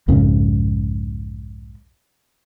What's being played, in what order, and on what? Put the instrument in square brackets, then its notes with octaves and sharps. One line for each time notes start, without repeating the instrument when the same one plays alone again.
[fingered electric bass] B1 F2 G#2 C#3